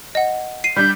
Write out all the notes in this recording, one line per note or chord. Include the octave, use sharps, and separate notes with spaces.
D#5 F#5
C7 D#7
G3 D4 G6